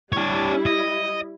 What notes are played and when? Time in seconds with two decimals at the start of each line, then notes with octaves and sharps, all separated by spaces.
0.13 G3 D4 E4 C#5
0.66 D#5